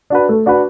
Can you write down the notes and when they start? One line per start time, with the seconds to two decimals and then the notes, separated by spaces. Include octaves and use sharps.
0.10 D4 F#4 B4
0.29 A3
0.46 D4 F#4 B4